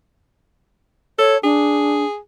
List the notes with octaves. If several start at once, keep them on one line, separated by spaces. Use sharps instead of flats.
A4 C#5
D4 G#4